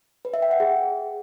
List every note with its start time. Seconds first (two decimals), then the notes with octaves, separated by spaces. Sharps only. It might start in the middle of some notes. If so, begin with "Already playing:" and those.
0.25 B4
0.34 E5
0.42 G5
0.51 F#5
0.60 G#4